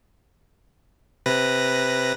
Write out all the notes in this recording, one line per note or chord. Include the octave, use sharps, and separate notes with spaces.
C3 B4 A#6